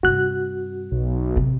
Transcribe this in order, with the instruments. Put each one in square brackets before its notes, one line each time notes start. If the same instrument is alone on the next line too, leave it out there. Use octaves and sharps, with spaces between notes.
[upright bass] G2 C3 [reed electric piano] F#4 F#6
[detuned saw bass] B1
[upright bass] A1 C3